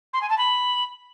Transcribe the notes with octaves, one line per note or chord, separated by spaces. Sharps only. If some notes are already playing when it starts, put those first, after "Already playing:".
C6
G#5
A5
B5